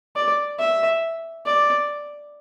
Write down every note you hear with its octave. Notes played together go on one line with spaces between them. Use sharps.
D5
E5
D5